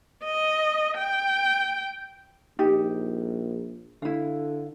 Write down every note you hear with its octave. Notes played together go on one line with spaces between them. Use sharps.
D#5
G5
A#1 D#4 G4
D3 E4 F5